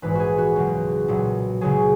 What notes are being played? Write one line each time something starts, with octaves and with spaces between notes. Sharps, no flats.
A#1 G#2 E3 G#3 B4
F#4 G#4
F#4
C#2 B2 F#3
B1 A#2 F#3
C#2 C#3 F#3 G#4